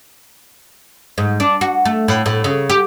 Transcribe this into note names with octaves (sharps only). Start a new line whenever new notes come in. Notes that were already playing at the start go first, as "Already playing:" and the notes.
G#2
D4
F#4
A3
A2
A2
C#3
G4